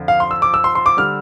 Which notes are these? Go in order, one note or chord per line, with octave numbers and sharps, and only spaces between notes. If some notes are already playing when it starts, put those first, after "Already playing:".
Already playing: F2 D3 F3
F5
C6
E6
D6
E6
C6
C6
D6
D3 G3 F6